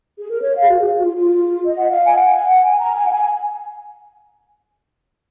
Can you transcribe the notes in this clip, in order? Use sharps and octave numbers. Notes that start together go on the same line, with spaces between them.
G#4
A#4
C#5
F5
G#4
F#4
G#4
F#4
F4
F4
D#5
F#5
F5
G#5
F#5
G#5
F#5
G#5
A#5
G#5
F#5
G#5